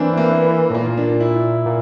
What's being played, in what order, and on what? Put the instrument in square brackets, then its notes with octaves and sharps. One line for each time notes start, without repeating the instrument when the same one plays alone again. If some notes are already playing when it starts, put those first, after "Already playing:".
Already playing: [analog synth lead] E3 [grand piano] A#3 C4 D4
[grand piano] A#3
[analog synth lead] A2
[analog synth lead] A#2 [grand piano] A#3
[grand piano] A#3
D4
D4
E4
[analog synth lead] A#2